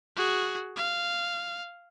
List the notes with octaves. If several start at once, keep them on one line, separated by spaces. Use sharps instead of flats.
F#4 G#4
F5